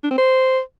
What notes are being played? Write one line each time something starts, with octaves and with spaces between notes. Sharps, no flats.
D4
C4
C5